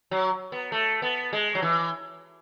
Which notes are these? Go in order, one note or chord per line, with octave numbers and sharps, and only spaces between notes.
F#3
B3
A3
B3
G#3
F#3
E3